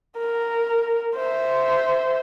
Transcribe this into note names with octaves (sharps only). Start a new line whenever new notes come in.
A#4
C5 E5